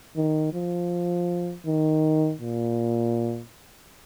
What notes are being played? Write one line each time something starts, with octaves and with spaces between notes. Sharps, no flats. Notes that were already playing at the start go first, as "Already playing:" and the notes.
D#3
F3
D#3
A#2